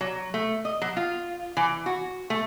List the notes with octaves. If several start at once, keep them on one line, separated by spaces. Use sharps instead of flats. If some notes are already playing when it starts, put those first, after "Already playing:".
F#3
A3
D#5
F#3
F4
E3
F#4
A3